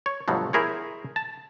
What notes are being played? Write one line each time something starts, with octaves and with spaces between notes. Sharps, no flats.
C#5
G1 D2 B2 F3 F#3
E4 G#4 A#4 C5 C#5
A5